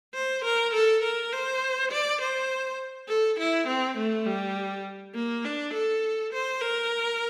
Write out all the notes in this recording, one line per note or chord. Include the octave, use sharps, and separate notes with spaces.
C5
A#4
A4
A#4
C5
D5
C5
A4
E4
C4
A3
G3
A#3
D4
A4
C5
A#4